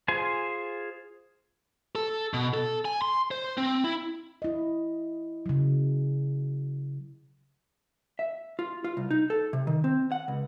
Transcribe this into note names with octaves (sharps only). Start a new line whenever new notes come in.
F4 G#4 C5 G#5
A4
B2
A4
G#5
C6
C5
C4
E4
E4 D#5
C#3 F#3
E5
F4
F4
C2
D#4
A4
C3
D#3
C4
F#5
C#2